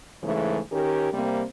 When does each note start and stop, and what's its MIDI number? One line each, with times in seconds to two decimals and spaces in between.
0.23 0.59 44
0.23 0.59 49
0.23 0.59 52
0.23 0.59 57
0.72 1.12 51
0.72 1.12 61
0.72 1.12 67
0.72 1.12 70
1.13 1.44 48
1.13 1.44 55
1.13 1.44 58
1.13 1.44 60